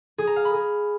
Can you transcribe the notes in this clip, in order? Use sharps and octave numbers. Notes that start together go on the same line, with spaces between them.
G#4
A#5
F5
B5
G#4